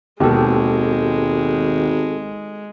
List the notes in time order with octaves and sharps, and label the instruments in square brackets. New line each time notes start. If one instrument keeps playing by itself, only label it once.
[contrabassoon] G#1 [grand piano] D#2 B2 D#3 [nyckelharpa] G#3 [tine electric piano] G4 A4